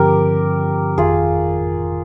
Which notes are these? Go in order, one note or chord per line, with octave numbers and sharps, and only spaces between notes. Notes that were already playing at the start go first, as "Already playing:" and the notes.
Already playing: G2 D3 F3 C4 G4 A#4
G1 F2 D#3 F4 G#4